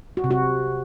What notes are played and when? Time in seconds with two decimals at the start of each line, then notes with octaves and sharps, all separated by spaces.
0.17 F#4
0.24 C3
0.31 F#4